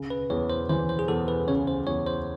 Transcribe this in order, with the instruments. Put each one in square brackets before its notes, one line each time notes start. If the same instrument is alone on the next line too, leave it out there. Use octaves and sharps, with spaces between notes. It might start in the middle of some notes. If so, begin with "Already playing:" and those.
Already playing: [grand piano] C#3
[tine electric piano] B4
[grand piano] E2 [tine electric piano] C#5
[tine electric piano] C5
[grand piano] E3 [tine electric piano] C5
[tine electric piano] C5
G#4
[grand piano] E2 [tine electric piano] A4
[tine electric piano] B4
[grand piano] C#3 [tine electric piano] C#5
[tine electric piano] C5
[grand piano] E2 [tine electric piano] C#5
[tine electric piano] C5